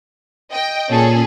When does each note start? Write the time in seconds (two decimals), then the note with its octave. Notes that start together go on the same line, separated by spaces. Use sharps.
0.52 D#5 G5
0.89 A#2 C#4 G#4 A4